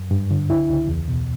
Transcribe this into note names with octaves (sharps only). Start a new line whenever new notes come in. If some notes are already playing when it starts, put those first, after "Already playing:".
Already playing: F#2
G2
D3
C#2 E4
C#2
E2
B2